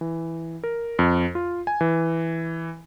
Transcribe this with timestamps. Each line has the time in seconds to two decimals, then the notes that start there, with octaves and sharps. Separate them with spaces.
0.01 E3
0.64 A#4
0.99 F2
1.35 F4
1.67 G#5
1.81 E3